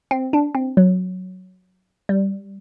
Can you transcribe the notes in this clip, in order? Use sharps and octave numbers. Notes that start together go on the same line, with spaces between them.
C4
D4
C4
F#3
G3